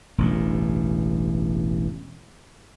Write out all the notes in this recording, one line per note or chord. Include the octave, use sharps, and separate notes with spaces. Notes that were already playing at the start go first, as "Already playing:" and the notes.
E1 A1 G2